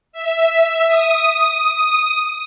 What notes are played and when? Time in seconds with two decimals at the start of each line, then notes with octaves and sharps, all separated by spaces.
0.12 E5
0.88 D#6